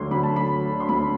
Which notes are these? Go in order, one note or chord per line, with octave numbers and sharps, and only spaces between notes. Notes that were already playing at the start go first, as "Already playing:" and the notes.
Already playing: D2 D3 F#3 A3 C6
D2 B5
A5
A3 B5
F#3
D3
C6
D2 B5